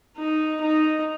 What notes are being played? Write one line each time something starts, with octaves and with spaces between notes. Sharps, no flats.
D#4
D#4